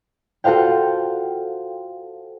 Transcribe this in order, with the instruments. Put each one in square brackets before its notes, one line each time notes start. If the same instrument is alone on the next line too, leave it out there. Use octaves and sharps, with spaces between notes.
[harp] F4 F#4 A4 C5 F5 G5